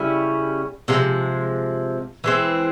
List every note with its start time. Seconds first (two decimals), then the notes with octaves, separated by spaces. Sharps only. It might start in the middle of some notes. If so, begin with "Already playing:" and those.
Already playing: C#3 G3 C#4 E4
0.88 C3 F3 G#3
2.24 E3 G#3 C4